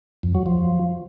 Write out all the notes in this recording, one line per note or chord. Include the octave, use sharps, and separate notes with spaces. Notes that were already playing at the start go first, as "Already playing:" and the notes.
F2
F#3
F3